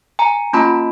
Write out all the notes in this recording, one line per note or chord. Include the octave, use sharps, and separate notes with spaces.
G#5 A#5
A#3 C#4 F4 A5 B5